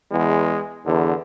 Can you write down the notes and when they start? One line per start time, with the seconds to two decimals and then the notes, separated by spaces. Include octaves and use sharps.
0.12 E2 G#3
0.86 E2 D3